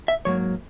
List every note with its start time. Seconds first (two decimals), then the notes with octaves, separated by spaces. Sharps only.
0.08 E5
0.25 G#2 F#3 A#3 C#5